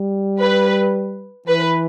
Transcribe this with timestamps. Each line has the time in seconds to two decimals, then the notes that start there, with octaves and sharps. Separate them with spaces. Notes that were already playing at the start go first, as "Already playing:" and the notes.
Already playing: G3
0.40 B4
1.47 E3 B4